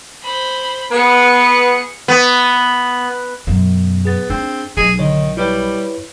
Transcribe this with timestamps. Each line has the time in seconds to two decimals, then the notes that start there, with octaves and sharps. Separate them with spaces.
0.23 C5 B5
0.92 B3 G#4 C#7
2.08 B3
3.47 F#2 B2
4.05 B3 G#4 A6
4.30 C4 D4
4.77 B1 F#3 G#4
4.99 D3 D#3 C#5
5.37 G3 E4 B4 C#5